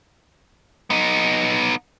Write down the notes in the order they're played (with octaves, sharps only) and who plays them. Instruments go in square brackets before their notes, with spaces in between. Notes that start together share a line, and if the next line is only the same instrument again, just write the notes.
[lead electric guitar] B3 D#4